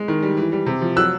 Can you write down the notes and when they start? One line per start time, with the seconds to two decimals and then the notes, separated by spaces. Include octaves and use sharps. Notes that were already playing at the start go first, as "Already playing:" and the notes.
Already playing: G#3
0.08 D#3
0.23 G3
0.37 E3
0.52 G3
0.66 C3
0.82 F3
0.96 F#3 E6 F#6